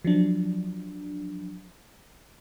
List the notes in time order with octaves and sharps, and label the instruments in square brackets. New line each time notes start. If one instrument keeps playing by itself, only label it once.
[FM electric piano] F3 F#3 D4